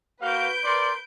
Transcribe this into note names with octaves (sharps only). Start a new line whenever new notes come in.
A#3 F#4 B4 F5 G6 D7
A#4 D5 C6